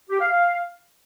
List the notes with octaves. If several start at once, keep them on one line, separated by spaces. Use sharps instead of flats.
G4
F5
F5